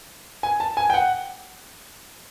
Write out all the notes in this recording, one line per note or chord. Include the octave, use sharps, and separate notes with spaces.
G#5
A5
G#5
G5
F#5